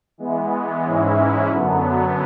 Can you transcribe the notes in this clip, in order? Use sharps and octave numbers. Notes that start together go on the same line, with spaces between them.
E3 G#3 B3
G#2 E3 G#3 C#4 E4
F#2 D3 F#3 B3